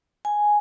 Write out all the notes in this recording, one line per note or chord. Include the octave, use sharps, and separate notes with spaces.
G#5